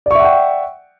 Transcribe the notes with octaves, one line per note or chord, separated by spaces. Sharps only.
D5 E5 F#5 G5 C#6